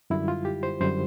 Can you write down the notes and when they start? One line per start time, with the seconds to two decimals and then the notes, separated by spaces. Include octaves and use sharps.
0.10 F#2 D3 G3 E4
0.28 F4
0.45 G4
0.63 C5
0.80 F#2 D3 G3 C5